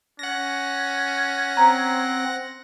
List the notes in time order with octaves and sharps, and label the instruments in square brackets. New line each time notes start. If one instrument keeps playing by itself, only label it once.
[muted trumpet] C#4 [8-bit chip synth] F#5 A#6
[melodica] C4 [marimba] A#5